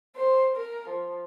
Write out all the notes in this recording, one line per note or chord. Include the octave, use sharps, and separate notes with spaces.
C5
A#4
F3